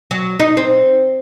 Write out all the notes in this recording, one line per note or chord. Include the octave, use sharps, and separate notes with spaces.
F#3
D#4
C4